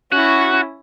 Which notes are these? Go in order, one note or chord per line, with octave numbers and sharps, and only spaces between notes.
C#4 E4 F#4